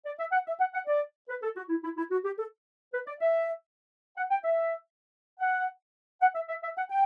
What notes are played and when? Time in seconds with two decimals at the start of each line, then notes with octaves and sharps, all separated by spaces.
0.06 D5
0.19 E5
0.32 F#5
0.47 E5
0.60 F#5
0.74 F#5
0.87 D5
1.29 B4
1.43 A4
1.56 F#4
1.69 E4
1.83 E4
1.97 E4
2.11 F#4
2.24 G4
2.38 A4
2.93 B4
3.07 D5
3.20 E5
4.16 F#5
4.30 G5
4.44 E5
5.40 F#5
6.21 F#5
6.35 E5
6.49 E5
6.63 E5
6.77 F#5
6.90 G5